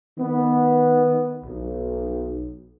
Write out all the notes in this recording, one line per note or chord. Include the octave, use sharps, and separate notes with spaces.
D#3 B3
B1